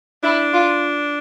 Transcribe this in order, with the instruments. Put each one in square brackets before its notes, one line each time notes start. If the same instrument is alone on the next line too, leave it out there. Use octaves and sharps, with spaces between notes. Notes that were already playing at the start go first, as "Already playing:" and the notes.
[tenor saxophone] D4 [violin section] E4
[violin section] F4